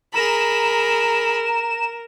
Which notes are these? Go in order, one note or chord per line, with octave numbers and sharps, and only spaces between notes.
G#4 A#4 A#5 B5 E7